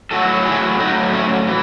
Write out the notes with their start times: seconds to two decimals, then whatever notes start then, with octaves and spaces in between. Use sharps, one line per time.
0.11 A2 F#3 F#4 A4
0.46 E4 G#4
0.79 A2 F#3 D#4 F#4
1.13 C#4 E4
1.47 E3